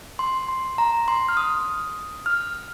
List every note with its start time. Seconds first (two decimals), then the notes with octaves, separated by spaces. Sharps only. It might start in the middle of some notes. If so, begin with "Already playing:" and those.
0.19 C6
0.49 C6
0.78 A#5
1.08 C6
1.29 F6
1.37 D#6
2.26 F6